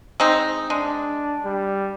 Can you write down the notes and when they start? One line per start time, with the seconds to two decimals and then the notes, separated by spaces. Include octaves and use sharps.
0.20 G#3 C4 D#4
0.70 G#3 D4
1.45 G3